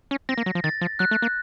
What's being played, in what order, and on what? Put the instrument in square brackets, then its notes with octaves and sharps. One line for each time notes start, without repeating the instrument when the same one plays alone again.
[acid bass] C#4
[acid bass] C4 [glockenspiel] A#6
[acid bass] A#3
F#3
F3
[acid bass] D#3 [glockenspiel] A6
[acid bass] F3
[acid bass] F#3 [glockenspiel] F#6
[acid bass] A3
A#3